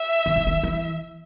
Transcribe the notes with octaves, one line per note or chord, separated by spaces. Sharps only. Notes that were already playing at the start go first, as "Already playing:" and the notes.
Already playing: E5
D#3
E3
D#3
E3